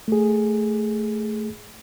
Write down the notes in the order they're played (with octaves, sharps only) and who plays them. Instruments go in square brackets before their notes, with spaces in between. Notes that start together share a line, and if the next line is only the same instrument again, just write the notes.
[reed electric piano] A3 G#4